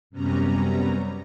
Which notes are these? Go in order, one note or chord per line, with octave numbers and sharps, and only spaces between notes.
F#2 C3 G3 B3 C#4 A#5